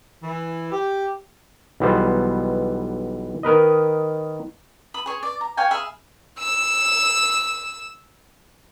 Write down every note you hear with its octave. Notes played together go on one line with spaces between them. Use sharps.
E3
G4
B1 E3 G3 B3 C5
D#3 A#4 B4 D#5
B5 D#6
G#4 C#5
D5
A#5
C#5 F5 G5 G#5
G#4 E5 F5 B5
E6 E7